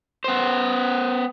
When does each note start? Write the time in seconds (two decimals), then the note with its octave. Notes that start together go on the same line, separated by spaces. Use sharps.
0.24 B3 C5